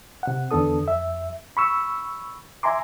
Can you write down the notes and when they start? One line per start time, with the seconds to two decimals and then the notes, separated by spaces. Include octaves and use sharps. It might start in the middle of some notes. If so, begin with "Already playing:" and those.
0.23 C3 F#5
0.51 E2 D3 B3 D4 A4 D#6
0.83 F2 E5
1.57 B5 C#6 E6
2.63 E5 G#5 A#5 C6 D6